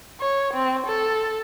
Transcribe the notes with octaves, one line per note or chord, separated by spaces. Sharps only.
C#5
C4
A4